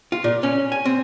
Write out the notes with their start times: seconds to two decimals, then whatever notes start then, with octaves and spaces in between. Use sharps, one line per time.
0.12 F4
0.24 A#2
0.43 C#4
0.72 G#5
0.85 C4